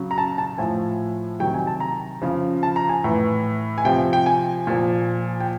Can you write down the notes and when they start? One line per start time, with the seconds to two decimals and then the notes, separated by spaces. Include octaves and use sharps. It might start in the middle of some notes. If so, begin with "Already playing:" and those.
Already playing: C#3 F#3
0.11 A#5
0.18 A5
0.38 A5
0.58 A2 F3 G#5
1.40 C3 D#3 F#3 G5
1.54 G#5
1.67 A5
1.80 A#5
2.22 C#3 F3
2.63 A5
2.76 A#5
2.89 G#5
3.04 A2 E3
3.78 G#5
3.85 C3 F3 G5
4.13 G5
4.26 G#5
4.67 A#2 F3
5.40 G5